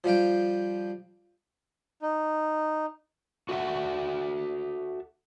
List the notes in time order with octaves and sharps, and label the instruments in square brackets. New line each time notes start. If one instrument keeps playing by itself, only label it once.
[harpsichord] F3 G3 F5 G5
[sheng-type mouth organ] D#4
[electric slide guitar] F#4 A4 E5 F#5